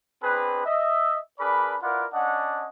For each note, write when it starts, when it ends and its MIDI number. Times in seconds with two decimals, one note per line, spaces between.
0.23 0.62 59
0.23 0.62 60
0.23 0.62 62
0.23 0.62 68
0.23 0.62 71
0.65 1.18 75
0.65 1.18 76
1.40 1.77 62
1.40 1.77 68
1.40 1.77 70
1.40 1.77 71
1.40 1.77 74
1.40 1.77 83
1.82 2.06 64
1.82 2.06 65
1.82 2.06 70
1.82 2.06 71
1.82 2.06 74
1.82 2.06 78
2.13 2.67 61
2.13 2.67 62
2.13 2.67 75
2.13 2.67 78